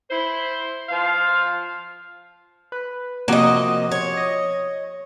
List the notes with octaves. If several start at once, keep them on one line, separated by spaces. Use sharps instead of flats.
E4 C5
F3 C5 F5
B4
C3 F3 A#3 F#4 D#5
C#5
D#5